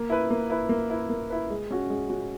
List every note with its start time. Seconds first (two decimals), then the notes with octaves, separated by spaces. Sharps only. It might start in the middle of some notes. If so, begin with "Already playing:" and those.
Already playing: A#3
0.10 E4 B4
0.30 A#3
0.50 E4 B4
0.69 A#3
0.90 E4 B4
1.09 A#3
1.30 E4 B4
1.50 G#3
1.71 C#4 F#4
1.90 G#3
2.10 C#4 F#4